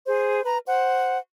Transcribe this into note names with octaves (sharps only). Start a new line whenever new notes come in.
G#4 C5
B4 A#5
C5 F#5